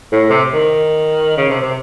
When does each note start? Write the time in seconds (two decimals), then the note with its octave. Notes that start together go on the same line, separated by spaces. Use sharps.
0.12 A2
0.30 C3
0.54 D#3
1.37 C#3
1.49 C3
1.62 C3